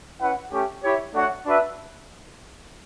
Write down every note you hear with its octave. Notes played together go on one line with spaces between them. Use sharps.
C#4 E4 B4 F#5
A3 C#4 G4
E4 G4 C#5
A3 D4 F#4 C#5 F#5
D4 F#4 B4 E5